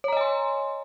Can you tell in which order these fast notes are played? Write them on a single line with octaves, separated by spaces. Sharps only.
C#5 A#5 D#5 G#5 C6